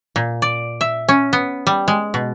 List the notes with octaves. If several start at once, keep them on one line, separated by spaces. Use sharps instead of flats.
A#2
D5
E5
C#4
B3
G3
G#3
B2